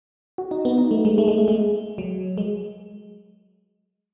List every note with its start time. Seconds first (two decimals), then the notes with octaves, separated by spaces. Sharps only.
0.38 F#4
0.51 D#4
0.65 B3
0.78 D#4
0.91 A3
1.05 G#3
1.18 A3
1.28 G#3
1.38 A3
1.48 G#3
1.98 F#3
2.38 G#3